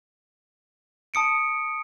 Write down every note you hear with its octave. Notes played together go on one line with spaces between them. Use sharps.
A5 D#6 C#7 D7